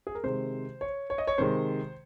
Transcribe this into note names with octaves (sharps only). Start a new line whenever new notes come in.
G#4
A#4
C3 D#3 G#3 C5
C#5
C#5
D#5
C#5
C3 D#3 G#3 C5